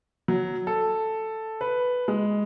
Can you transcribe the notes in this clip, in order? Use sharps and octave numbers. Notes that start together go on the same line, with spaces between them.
F#3
A4
B4
G#3